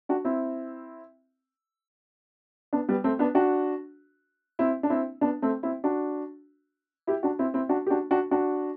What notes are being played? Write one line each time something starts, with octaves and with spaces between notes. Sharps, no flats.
D4 F#4
C4 E4
B3 D4
G3 B3
A3 C4
B3 D4
D4 F#4
C4 E4
D4
C4 E4
B3 D4
A3 C4
C4 E4
D4 F#4
E4 G4
D4 F#4
C4 E4
C4 E4
D4 F#4
G4
D4 F#4
D4 F#4
D4 F#4